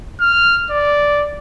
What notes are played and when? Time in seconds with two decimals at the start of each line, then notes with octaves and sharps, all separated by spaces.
0.21 F6
0.71 D5